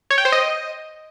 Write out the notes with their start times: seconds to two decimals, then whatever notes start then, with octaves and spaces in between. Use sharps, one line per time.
0.10 C#5
0.18 G5
0.25 C5
0.32 D#5